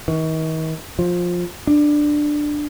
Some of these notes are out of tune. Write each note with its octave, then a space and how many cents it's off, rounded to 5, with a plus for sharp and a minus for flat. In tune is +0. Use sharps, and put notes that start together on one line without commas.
D#3 +40
F3 +15
D4 +10